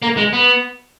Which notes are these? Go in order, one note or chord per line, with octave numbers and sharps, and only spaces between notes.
A#3
G#3
B3